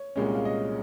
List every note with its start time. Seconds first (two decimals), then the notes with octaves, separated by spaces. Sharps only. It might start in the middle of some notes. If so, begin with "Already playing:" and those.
Already playing: C#5
0.16 C2 A#2 G#3 C#4
0.35 F5
0.45 D#5